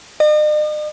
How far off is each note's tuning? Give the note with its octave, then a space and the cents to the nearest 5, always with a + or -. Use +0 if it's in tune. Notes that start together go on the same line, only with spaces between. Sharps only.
D#5 -45